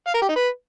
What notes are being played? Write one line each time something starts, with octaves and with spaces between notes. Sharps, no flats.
F5
A#4
G4
D#4
B4